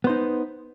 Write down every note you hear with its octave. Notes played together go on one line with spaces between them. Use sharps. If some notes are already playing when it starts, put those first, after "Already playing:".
B3 D#4 C5